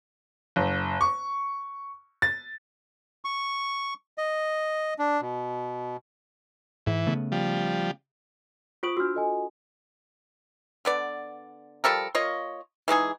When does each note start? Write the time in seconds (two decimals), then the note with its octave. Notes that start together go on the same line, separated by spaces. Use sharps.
0.56 F#1
1.01 C#6
2.22 A6
3.25 C#6
4.18 D#5
4.99 D4
5.21 B2
6.86 G#2 E3
7.06 C#3 A3 B3
7.32 F3 G3
8.83 F4 C5 C#6 D#6 D7 F#7
8.97 D4 F#4 E6 F6
9.15 A4 D#5 G#5
10.85 D3 B3 D5
11.84 F3 G3 A4 A#4
12.15 A#3 F4 C#5 D#5
12.88 E3 G#3 D#4 G#4